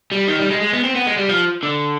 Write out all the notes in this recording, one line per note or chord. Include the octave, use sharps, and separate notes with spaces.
G3
D#3
G3
G#3
G#3
B3
C4
B3
G#3
G3
F3
D3